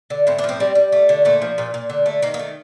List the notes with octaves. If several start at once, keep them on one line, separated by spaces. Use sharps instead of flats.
D3
A2 C4
D4
F3 C4
G3
G3
A3
D3
A#2 A3
F3
A#2
A#2
D3
A3
D#3 A#3
A#3
A3